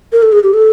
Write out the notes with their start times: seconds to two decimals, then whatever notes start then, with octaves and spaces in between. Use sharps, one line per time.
0.12 A#4
0.23 A4
0.32 G#4
0.43 G4
0.54 A4